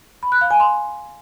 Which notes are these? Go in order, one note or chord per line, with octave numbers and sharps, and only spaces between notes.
B5
F#6
F5
G#5
C6